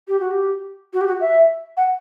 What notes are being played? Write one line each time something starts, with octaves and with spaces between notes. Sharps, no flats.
G4
F#4
G4
F#4
G4
F#4
E5
F#5